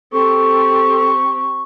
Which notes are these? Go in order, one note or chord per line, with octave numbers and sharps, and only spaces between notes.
C4 G4 A4 C#6